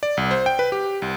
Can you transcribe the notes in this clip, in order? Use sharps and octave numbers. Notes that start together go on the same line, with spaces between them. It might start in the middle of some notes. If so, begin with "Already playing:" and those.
D5
C2
C5
G5
B4
G4
C2